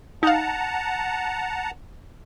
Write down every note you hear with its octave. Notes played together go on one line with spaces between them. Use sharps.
D#4 F5 F#5 A5 A#5